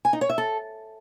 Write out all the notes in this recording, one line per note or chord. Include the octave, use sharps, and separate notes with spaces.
G#5
D#4
C#5
E5
A4